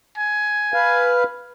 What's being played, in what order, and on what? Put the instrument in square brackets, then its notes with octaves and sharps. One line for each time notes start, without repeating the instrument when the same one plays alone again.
[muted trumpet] G#5
[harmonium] B4 F5